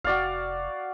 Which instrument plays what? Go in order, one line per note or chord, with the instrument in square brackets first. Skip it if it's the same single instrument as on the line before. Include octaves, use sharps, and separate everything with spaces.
[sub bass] F1 [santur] F#4 D5 F5